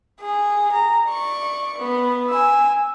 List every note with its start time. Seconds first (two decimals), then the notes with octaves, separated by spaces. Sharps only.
0.21 G#4
0.72 A#5
1.07 D5 C#6
1.77 B3
2.29 G#5 E6